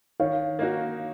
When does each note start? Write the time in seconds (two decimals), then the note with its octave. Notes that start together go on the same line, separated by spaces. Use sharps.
0.20 D#3 C#5 F5
0.59 A#3 D#4 F#4